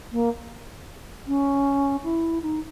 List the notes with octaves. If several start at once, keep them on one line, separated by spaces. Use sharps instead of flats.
A#3
C#4
E4
D#4